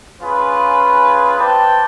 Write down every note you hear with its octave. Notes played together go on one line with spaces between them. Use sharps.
C#4 F4 G#4 B4
C4 B4 D5 G5 A5